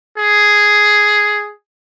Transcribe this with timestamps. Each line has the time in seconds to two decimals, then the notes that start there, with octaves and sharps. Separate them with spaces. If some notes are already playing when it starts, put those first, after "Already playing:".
0.17 G#4